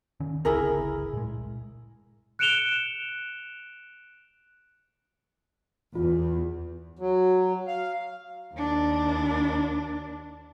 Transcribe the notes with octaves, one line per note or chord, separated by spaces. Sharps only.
D#3 C#4
G1 C#2 E4 G#4 A#4
A#2 G#3
F#6 C#7 D7 E7 F7 G7
E2 F4
F#3
F5
D#2 D4